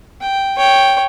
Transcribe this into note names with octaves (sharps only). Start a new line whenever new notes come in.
G5
C#5 G5